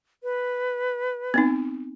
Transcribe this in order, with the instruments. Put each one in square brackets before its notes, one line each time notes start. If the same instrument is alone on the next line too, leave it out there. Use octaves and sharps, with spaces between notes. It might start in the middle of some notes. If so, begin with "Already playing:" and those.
[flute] B4
[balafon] B3 C4 D#4